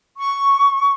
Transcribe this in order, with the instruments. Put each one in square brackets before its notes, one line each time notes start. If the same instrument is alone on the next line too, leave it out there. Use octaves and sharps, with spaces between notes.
[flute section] C#6